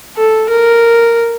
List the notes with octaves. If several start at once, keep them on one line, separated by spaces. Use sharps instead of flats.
A4
A#4